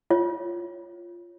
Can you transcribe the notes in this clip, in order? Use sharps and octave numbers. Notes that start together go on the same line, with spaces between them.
F4 C#5